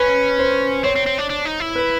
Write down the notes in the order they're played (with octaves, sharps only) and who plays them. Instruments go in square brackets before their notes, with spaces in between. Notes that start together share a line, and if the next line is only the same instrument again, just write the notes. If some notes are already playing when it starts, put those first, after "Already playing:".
Already playing: [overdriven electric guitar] C#4 [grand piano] B4
[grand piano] C5
[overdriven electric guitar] C4 [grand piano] C#5
[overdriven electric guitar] C4
C4
D4
D4
D#4
E4
[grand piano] B4